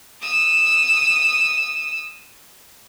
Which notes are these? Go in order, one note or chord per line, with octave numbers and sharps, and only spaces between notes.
D#6 E6